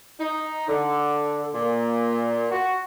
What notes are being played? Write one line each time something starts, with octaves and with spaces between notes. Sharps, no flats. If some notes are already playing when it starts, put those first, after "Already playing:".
D#4
D3
A#2
F#4